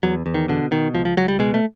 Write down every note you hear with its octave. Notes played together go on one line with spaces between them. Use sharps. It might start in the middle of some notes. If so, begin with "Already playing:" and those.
E2 F#3
E2
D#3
B2 D3
B2 D#3
C#2 F3
F3
C#2 F#3
G3
B2 G#3
A3